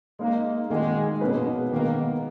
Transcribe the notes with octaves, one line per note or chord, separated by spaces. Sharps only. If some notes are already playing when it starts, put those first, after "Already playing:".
G#3 A#3 D#4 A#4
D#3 G#3 A#3 D#4 F#4
B2 A#3 C#4 G#4 B4
D#3 G#3 A#3 B3